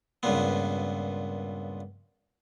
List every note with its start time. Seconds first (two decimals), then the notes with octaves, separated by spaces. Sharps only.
0.23 C#2 G2 A#2 B3